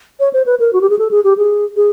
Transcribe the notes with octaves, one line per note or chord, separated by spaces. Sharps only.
C#5
C5
B4
A#4
F#4
G4
G#4
A4
G#4
G4
G#4
G#4